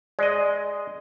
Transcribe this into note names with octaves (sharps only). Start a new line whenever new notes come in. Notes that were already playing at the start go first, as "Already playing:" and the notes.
G#3 D5 D#5